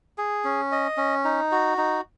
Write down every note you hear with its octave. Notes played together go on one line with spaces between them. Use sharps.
G#4
C#4
D#5
C#4
D#4
F#4
D#4